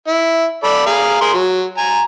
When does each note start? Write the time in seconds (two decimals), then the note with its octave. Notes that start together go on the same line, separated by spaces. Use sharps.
0.08 E4
0.64 A4 D5 B5
0.86 G#4 F5 A#5
1.21 G#4 A#4 C6
1.34 F#3
1.78 G#5 A#5